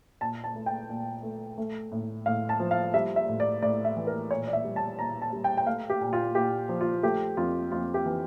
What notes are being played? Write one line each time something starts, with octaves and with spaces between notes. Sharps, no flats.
A#2 A5
A5
A3
G5
A#2
A3
A3
A2
A2 F5
A5
F3
F5
G3 E5
E5
A2
D5
A2 D5
E5
E3
A#4
A#2 C#5
D5
E5
G3
A5
A#2 A#5
A5
G3
G5
G5
A3 F5
G4
A#2
F4
A#2 G4
F3
F4
A3 G4
F2 F4
F2 F4
G4
E3